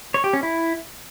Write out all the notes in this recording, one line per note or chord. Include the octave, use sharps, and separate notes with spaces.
C#5
G4
C#4
E4